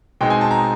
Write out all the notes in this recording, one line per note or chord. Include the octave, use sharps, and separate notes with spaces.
B2 G#3 C4 D#4 G5
G#5
A5
A#5